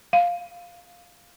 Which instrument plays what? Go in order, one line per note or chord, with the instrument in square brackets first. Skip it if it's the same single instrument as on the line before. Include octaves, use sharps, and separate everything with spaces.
[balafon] F5